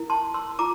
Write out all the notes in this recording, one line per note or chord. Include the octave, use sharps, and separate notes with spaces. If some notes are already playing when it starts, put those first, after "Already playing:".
Already playing: E4 A#4
A5 C6
C6 E6
F4 A#5 D6